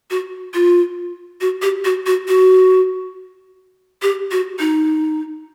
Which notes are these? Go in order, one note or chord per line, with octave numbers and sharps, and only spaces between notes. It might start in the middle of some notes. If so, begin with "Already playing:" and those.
F#4
F4
F#4
G4
F#4
F#4
F#4
G4
F#4
D#4